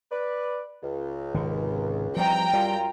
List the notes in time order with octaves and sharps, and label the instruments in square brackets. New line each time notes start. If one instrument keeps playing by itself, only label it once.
[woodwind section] B4 D5
C#2
[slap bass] G#1 C3 D#3
[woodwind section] G#2 E3 C4 [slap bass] F3 G3 [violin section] G5 A#5
[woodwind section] F#2 F4 [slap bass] G3